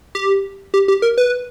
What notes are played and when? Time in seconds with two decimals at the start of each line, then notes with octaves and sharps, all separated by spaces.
0.15 G4
0.74 G4
0.88 G4
1.02 A#4
1.18 B4